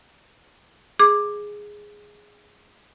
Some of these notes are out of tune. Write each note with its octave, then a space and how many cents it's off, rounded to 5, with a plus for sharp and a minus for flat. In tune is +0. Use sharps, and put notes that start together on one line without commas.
G#4 +0 D6 +10